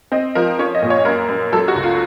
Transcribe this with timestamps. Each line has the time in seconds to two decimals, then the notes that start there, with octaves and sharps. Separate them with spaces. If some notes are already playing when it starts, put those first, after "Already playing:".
0.12 C4 D#5
0.35 F3 A#4
0.59 C#4 C#5
0.75 D#5
0.82 A#2
0.90 C#5
1.05 F#2 A#4
1.29 F#2
1.53 F#3 A4
1.68 F#4
1.75 C#2
1.83 F4